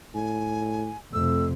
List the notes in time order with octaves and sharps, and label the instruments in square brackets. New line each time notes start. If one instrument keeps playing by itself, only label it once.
[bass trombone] A2 [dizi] G#5
[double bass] F2 C3 [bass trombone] A3 [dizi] E6